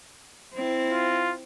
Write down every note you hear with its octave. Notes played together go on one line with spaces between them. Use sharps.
C4 E4
F4